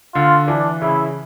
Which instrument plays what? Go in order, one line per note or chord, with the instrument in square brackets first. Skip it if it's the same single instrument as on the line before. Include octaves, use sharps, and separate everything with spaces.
[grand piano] D3 [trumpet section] F4
[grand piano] E3 [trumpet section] D4
[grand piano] C#3 [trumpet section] E4